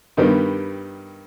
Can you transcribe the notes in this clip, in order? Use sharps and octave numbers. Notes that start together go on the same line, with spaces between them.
G2 D#3 G3 B3